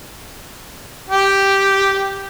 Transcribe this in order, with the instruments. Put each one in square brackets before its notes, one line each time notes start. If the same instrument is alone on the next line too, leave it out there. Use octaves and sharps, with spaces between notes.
[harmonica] G4